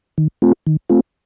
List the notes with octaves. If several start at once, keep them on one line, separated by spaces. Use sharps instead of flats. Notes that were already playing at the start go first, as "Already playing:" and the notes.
D#3
A3 C4 F4
D#3
A3 C4 F4